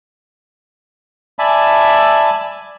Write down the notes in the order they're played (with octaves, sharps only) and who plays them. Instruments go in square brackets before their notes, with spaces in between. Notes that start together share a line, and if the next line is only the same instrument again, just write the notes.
[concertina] D5 E5 G#5 A5 B5